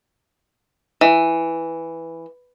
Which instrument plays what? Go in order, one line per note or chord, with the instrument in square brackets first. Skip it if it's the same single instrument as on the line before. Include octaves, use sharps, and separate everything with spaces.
[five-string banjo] E3